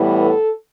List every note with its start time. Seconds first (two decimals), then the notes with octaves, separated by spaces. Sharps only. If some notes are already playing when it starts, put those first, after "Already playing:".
Already playing: A2 E3 G3 B3
0.18 A4